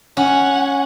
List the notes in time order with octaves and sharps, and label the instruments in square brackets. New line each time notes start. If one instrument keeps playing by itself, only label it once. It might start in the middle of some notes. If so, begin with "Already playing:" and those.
[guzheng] C#4 [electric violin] F#5 G#5